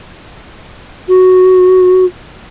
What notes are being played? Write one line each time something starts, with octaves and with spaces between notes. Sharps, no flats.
F#4